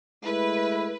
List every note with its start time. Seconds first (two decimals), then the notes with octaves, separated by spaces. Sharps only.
0.24 G#3 A3 E4 B4